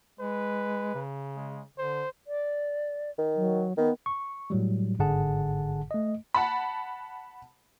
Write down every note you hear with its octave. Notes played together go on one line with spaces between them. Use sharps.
G#3 B4
C#3
G#3
D3 C5
D5
D#3
F#3
D#3 B3
C#6
A2 F#3 G3
G1 G#2 D3 G#4 F#5 A5
A3 D#5
F#5 A5 B5